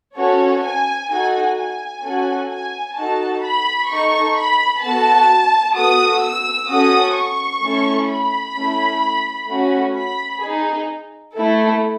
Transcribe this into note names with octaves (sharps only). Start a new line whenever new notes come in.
C#4 F#4 A4 C#5
G#5
D#4 F#4 A4 G#5
G#5
C#4 F#4 A4
G#5
D#4 F#4 A4 A5
B5
D#4 A4 C#6
B5
B3 F#4 A4 A5
B3 F#4 A4 D#6
E6
C#4 F#4 A4 D#6
C#6
A3 C#4 E4 A4
B5
A3 C#4 E4
A3 C#4 F#4
B5
D#4 G#4
A3 E4 A4